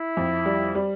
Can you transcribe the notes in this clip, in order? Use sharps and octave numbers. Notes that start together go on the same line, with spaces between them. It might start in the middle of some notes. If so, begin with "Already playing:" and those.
Already playing: E4
F2
G3
G3